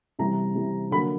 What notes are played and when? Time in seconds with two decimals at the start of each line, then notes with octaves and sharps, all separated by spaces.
0.19 C3 E3 G3 A#5
0.55 C3 E3 G3
0.91 D3 F#3 A#3 B5